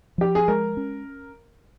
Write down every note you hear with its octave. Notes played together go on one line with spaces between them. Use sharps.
F3 G4
G#4
G#3 A#4
C#4